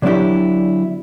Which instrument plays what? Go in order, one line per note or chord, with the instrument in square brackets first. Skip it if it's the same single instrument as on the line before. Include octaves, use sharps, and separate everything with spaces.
[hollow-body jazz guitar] D3 F#3 B3 D4 E4 G4